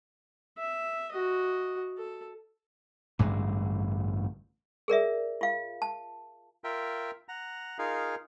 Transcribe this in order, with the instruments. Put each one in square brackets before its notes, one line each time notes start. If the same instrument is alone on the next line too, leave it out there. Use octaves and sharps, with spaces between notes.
[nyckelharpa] E5
F#4 D#5
A4
[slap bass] A1 G2 D3 G#3
[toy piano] G#4 A#4 D5 E5
F4 F5
A5
[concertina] F4 A#4 E5 G5
F#5 A#5
D#4 F4 G#4 A#4 F5